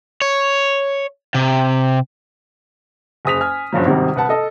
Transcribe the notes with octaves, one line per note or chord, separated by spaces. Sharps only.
C#5
C3
F#1 G#4 D#6 B6 F7
G#5 F6
F#1 G2 F3 F#3
G#1 C3 D#3 G3
C2 B4 F#5 A5
A4 D#5 A5